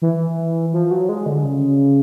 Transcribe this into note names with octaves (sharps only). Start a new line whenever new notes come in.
E3
F3
F#3
G#3
D3
C#3